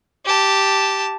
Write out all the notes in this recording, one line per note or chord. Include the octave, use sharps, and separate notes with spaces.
G4 A5